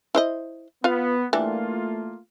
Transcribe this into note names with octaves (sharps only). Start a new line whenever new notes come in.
E4 C5 D#5
B3 F4 F5
E3 G3 A3 A#3 D4 F4